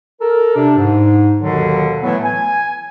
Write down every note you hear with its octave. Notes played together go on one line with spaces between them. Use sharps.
A4 A#4
C3 D4
G#2
D#2 B2 D3 D#3 F#3
A2 E3 F#3 A3 B3
G#5